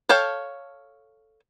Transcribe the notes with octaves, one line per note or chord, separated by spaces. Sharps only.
A4 C#5 F5 G5